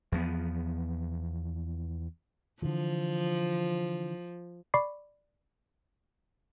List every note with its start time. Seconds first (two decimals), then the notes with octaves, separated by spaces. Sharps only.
0.12 E2 F3 B3
2.62 D3 E3 F3
4.74 D5 B5 C#6 D6 C7